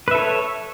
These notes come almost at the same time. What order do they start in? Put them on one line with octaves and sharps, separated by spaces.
B4 E5 A4 C#5